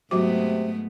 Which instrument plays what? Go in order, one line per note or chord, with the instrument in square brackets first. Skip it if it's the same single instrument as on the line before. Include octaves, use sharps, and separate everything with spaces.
[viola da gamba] G#2 A3 B3 [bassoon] C3 [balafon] F#3 F#4 D6